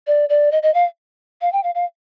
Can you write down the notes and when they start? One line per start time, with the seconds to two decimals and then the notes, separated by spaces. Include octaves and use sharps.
0.07 D5
0.29 D5
0.52 D#5
0.63 D#5
0.74 F5
1.41 F5
1.53 G5
1.63 F5
1.75 F5